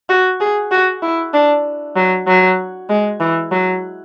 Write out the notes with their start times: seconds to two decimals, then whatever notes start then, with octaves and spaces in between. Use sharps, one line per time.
0.09 F#4
0.40 G#4
0.72 F#4
1.03 E4
1.34 D4
1.96 F#3
2.27 F#3
2.90 G#3
3.20 E3
3.52 F#3